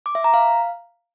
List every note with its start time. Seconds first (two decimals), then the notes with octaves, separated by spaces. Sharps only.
0.06 D6
0.15 E5
0.24 A#5
0.34 F5